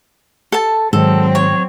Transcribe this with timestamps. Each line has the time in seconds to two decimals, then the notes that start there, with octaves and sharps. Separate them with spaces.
0.52 A4 A5
0.93 G#2 D#3 F#3 C4 A4
1.35 C#5